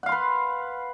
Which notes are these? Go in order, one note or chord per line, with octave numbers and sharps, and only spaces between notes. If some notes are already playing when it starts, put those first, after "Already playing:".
B4 F5 F#5 C6